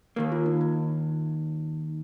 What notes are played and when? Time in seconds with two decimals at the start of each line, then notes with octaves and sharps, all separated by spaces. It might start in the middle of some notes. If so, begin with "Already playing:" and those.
0.16 D#2 D#3 A#3 A#4
0.32 F4
0.46 D#4
0.61 D#4